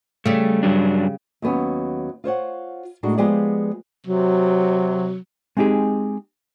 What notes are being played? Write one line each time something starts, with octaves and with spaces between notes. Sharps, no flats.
C#3 G3 A3
G2 F#3 D4
D#2 F#3 B3 C#4
F4 C5 C#5 F#5
A2 G#3 D4 D#4 F#4
F3 G#3 B3 G4 G#4 D5
C3 F#3
G#3 C4 D#4 G4 G#4